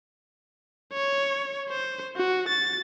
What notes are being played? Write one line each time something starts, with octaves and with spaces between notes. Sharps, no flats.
C#5
C5
F#4
A6